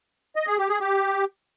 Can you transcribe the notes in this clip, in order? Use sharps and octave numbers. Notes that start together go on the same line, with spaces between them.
D#5
G#4
G4
G#4
G4